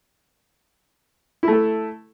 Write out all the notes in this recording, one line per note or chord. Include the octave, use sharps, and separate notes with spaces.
A3 E4 A4